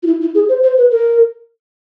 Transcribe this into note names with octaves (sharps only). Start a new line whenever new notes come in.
F4
E4
E4
G#4
C5
C5
B4
A#4